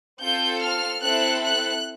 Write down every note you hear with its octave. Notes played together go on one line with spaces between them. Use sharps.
C4 F4 A4 G6
F6
C4 E4 A4 F#6
F#6